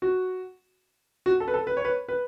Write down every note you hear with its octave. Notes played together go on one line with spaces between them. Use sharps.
F#4
F#4
A4
B4
A4
B4
C#5
B4
B4